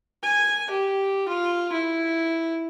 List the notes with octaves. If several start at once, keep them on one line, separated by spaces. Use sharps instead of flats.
G#5
G4
F4
E4